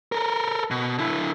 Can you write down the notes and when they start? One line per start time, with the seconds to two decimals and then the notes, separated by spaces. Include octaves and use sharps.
0.12 A4 A#4
0.71 B2
0.98 D3 E4